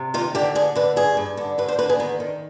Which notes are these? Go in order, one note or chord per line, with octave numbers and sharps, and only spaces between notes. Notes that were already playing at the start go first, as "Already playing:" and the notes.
Already playing: C3
D#3 F4
D3 G4
D3 G#4
D3 B4
G2 G#4
G2
D3
G2 B4
C5
D3 B4
G#4
D#3 B3
D#3